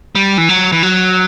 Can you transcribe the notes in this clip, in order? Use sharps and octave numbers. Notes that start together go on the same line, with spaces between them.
G3
E3
F#3
E3
F#3